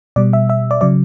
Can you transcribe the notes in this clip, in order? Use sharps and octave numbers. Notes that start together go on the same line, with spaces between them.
B2 G3 D5
E5
E5
D5
C#3 F#3 D5